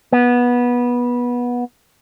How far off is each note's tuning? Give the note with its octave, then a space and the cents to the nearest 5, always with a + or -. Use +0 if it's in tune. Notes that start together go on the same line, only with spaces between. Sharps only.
B3 -20